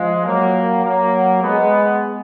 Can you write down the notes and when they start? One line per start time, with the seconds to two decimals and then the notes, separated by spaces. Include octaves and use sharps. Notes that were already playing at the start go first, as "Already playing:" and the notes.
Already playing: F3 G#3
0.25 F#3 A#3
0.84 F#3 A#3
1.42 G#3 B3